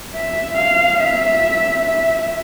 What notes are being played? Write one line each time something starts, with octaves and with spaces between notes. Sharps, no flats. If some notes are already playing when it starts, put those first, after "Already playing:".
E5
F5
E5
E5